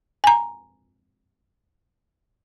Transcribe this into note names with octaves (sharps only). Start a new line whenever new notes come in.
G#5 A#5